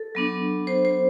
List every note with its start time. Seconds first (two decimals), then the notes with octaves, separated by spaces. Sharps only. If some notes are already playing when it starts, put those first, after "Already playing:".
Already playing: A4
0.15 F#3 B3 D4
0.67 C5
0.85 C5